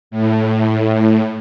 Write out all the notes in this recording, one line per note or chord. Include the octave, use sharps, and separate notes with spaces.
A2